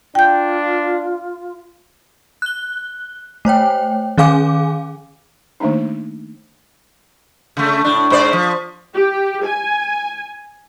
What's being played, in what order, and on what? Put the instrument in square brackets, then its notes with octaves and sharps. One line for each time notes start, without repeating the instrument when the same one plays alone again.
[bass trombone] D4 [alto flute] F4 [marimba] G5 G6
[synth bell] F#6 G7
A3 C5 C#5 G5
D#3 C#4 G#4 F5 G#5 D6
[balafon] D#3 A3 A#3 D4 D#4
[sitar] C#3 A3
A2 D4
G#2 C5 D5
F3
[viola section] G4
G#5